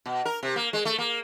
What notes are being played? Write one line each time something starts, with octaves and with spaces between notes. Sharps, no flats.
B2
A#4
C3
A#3
G#3
A3
A#3